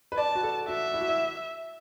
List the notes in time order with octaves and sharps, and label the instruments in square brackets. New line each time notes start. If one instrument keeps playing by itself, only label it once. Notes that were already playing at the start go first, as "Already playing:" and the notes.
[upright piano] B4
[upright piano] D5 [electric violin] A5
[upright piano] F#4
A4
[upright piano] F#4 [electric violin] E5
[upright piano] E4
F#4
E4